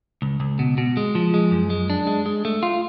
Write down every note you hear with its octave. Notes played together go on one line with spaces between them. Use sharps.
C#2
C#2
B2
B2
G#3
F3
G#3
F#2
G#3
D4
G#3
G#3
A3
F4